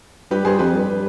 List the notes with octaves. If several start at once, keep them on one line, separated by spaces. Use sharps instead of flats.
G2 G4 B4
G2 G#4 C5
F2 G4 B4
G2